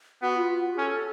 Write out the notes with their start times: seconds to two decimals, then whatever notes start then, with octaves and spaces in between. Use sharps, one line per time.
0.22 B3 F#4
0.36 F4
0.77 C#4 A4